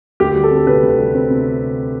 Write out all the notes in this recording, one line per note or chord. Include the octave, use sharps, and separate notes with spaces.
D2 G4
G3
A4
C4
C3 B4
D2
G3
C4
C3